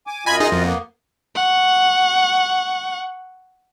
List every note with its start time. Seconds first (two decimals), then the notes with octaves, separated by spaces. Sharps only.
0.07 G#5 D6
0.26 F#2 F4 D#5 G#5 B5 G#6
0.40 D#4 G#4
0.52 F2
0.64 A#3 B3
1.35 F#5 C#6